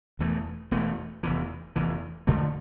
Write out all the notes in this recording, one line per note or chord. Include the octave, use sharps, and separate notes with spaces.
E1 E2 E3 A3
E1 E2 E3 A3
F1 E2 E3
F1 E2 E3
F2 D3 F3 A3